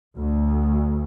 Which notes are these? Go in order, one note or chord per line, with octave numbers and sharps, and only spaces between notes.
D2